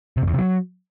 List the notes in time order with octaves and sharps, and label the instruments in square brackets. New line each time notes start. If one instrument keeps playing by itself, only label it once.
[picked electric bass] C3
F2
E2
C3
F#3